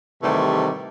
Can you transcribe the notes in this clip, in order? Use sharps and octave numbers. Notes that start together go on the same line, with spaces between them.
G#2 C3 D#3 E3 G3 A3